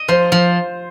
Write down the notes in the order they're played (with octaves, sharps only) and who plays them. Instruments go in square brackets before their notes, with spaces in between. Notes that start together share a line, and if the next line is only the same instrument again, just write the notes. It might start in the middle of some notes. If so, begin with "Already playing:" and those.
Already playing: [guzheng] D#5
[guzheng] F3 [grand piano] C5
[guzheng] F3